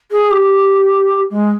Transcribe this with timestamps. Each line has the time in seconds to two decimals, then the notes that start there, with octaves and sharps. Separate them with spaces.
0.11 G#4
0.31 G4
1.31 G#3